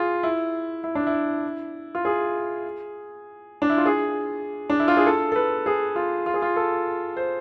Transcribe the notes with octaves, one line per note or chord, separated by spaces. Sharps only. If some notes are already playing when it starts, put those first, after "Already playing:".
Already playing: F4 G#4
E4
E4
D4
E4
F4
G#4
D4
E4
F4
G#4
D4
E4
F4
G#4
A4
A4
B4
G#4
F4
F4
G#4
F4
A4
C5